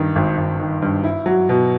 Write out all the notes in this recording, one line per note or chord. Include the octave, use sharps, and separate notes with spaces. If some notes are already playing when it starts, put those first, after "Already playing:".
Already playing: G2 D#3
G#1
G#1
D#3
G2
E4
F#3
B2